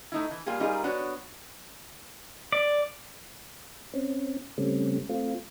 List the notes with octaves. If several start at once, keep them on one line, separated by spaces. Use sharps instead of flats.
A3 D#4 E4
E3
G3 A#3 F4 G4 G#4
G3 D#4 F4 G#4 A#4
B3 D4 F#4 C#5
D5
C4 C#4
C#3 G3 A3 C4 C#4
A3 C4 F4